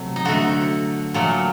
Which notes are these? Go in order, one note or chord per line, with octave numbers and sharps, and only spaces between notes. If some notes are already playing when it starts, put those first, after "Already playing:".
Already playing: C3 F#3 A3
D#4
D3 A3 F#4
A#2 F#3 A3